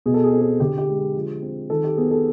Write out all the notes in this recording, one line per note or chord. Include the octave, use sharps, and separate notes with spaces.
B2 G#4
A4
G#4
C4 A4
G#4
D3 G4
G4
G#3
G#4
F3
C4
D#3 A4
G4
B3 G#4
A4